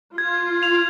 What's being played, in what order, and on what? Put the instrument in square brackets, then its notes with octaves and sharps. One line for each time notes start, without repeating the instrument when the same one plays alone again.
[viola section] F4 [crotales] G#6
[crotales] F7